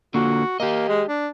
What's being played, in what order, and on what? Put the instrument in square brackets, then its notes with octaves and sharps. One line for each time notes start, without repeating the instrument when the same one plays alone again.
[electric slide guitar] D3 A#3 F4 [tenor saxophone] F#4
[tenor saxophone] A#3 [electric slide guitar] G4 D#5
[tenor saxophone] G#3
D4